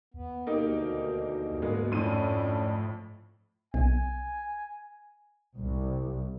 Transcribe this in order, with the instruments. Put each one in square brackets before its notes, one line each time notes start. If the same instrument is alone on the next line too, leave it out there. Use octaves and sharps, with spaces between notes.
[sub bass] D#2 [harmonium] B3
[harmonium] D2 B2 [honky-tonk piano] A#3 D#4 G4
[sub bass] G#2 [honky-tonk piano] G#3 A#3 B3
[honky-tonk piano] F2 A2 D#7 [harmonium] C#4 D4
[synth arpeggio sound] B1 [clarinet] G#5
[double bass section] C2